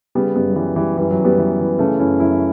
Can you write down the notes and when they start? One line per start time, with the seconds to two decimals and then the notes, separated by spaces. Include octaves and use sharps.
0.15 C#3 G3 B3
0.35 F#2 G3 B3
0.49 F#3
0.56 E3 G3
0.76 E3 G3
0.97 F#2 E3 G3
1.11 F#3
1.18 F#2
1.24 G3 B3
1.39 E3
1.59 E3
1.79 C#3 A3 C#4
1.99 F#2 C#4 E4
2.20 F#2 C#4 E4